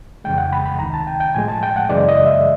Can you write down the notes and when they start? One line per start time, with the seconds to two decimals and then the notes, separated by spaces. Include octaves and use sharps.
0.24 F2 C#3 E3 G#3 G5
0.38 F#5
0.53 B5
0.65 B5
0.79 C#2 C3 D#3 A#5
0.94 A5
1.07 G5
1.20 G5
1.35 A2 F3 G#3 G#5
1.48 A5
1.63 G5
1.76 F#5
1.89 F#2 C#3 E3 G#3 D5
2.09 D#5
2.26 E5